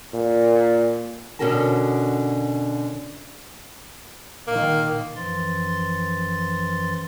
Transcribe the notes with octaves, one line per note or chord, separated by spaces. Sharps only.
A#2
B2 D3 C#4 F#4 A#4 A5
A#2 D#3 A#3
F#2 E3 F3 C6 A6